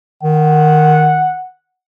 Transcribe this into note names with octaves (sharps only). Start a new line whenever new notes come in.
D#3 F#5